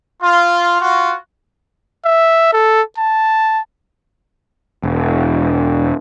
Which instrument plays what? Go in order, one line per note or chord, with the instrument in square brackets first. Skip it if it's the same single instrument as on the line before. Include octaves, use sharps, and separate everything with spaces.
[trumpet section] F4
F4 F#4
[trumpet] E5
A4
A5
[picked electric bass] E1